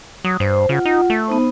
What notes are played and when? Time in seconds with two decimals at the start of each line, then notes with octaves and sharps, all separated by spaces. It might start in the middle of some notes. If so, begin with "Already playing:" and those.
0.25 F#3 D#6
0.40 G2 C5
0.69 C#3 F4 F#5
0.85 D#4
1.10 A3
1.28 B3 D#4 C5